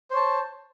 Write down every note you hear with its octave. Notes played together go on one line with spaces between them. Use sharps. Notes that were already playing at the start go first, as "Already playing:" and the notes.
C5 C#5 A5